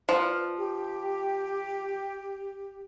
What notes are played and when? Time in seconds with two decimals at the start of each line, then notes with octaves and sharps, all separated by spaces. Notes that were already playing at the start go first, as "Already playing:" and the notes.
0.09 F3 B4 D5 F6
0.57 G4